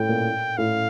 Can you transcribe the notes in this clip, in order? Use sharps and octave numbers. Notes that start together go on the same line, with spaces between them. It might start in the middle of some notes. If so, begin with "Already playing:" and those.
Already playing: A2 G5
A#2
A2 F5